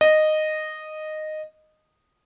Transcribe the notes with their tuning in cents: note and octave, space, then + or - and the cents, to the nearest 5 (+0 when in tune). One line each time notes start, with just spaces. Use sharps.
D#5 -10